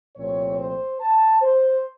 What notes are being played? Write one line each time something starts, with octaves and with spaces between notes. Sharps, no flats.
C2 A#2 F3 A3 C4 C#5
C5
A5
C5